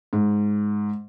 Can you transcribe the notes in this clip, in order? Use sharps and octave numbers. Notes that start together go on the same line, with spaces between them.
G#2